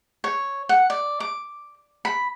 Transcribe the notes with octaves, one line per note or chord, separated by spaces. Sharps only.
C#5
F#5
D5
D6
B5